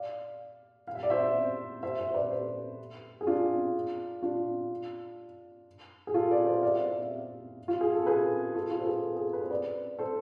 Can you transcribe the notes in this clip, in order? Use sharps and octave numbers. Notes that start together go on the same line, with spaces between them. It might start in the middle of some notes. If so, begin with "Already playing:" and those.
Already playing: D5 F5
F5
E5
D5
C5 E5
C5 E5
C5 E5
C5
B4 D5
A4 C5
G#4
D4 F4
D4 F4
G#4
F4 A4
B4 D5
C5 E5
D5 F5
D5 F5
C5 E5
F4
G#4
A4
G#4 B4
F4 A4
F4 A4
C5
G#4 B4
G#4
A4
B4
C5
B4 D5
A4 C5